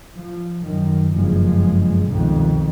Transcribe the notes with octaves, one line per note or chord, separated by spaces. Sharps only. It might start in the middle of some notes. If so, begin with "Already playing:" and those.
F3
F#2 D#3
F#1 G2 F3 G#3
C2 F2 B2 D#3